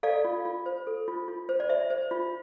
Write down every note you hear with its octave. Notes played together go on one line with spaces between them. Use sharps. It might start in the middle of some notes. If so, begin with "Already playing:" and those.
A4 D5 F5
F4
F4
C5
A4
F4
F4
C5
D5
C5 E5
C5
F4